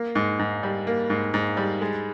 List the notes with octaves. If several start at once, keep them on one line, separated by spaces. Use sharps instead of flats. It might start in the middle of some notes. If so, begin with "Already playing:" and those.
Already playing: A#3
G#2
G#2
G3
A#3
G#2
G#2
G3
G#3